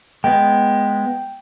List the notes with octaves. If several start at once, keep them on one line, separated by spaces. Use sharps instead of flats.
G#3 B3 G5